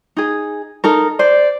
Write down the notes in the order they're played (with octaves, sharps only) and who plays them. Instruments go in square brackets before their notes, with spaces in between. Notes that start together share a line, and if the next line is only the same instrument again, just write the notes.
[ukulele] D#4 G#4
D#4 A4 A#4
[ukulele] C5 [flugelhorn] D5